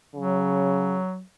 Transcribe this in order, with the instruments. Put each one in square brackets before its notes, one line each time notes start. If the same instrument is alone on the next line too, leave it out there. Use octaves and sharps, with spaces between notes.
[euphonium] C#3 [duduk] F#3